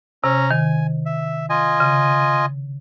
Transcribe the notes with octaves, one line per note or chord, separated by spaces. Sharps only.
C3 C#4 A#5
D#3 G#5
E5
F4 D#5 G#5
C#3